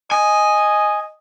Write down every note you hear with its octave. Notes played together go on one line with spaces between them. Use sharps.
D#5 G#5